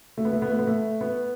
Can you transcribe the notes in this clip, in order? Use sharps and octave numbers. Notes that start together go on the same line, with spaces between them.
A3
B3
A3
B3
A3
B3
A3
B3